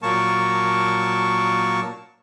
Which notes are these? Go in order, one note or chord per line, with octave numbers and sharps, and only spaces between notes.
A#2 F#3 A#3 A#4 A5 C#6